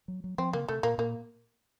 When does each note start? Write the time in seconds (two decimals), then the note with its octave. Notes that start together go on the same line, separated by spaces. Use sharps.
0.08 F#3
0.24 F#3
0.38 F3 C4
0.53 C#3 A#3
0.68 C3 A3
0.83 A#2 A#3
0.98 A#2 A#3